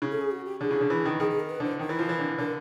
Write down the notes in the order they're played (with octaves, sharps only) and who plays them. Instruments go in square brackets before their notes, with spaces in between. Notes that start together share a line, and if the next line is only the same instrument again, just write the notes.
[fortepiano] C#3
[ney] A4
G#4
F#4
G4
[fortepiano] D3 [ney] G#4
[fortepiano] C#3
D3
E3
D#3
[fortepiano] D#3 [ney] G#4
[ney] G#4
A#4
B4
[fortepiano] D3
[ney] C5
[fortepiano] D#3 [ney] A#4
[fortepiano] E3
F3
E3
D3
[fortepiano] D3 [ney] A#4